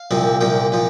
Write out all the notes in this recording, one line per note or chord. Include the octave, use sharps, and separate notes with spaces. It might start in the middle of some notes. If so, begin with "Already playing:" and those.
Already playing: F5
C2 A#2 F3 C4
C2 A#2 F3 G5
A#2 F3